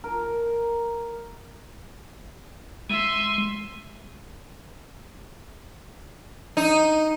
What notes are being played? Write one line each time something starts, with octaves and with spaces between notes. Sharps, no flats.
A#4
G#3 E5 C6
D#4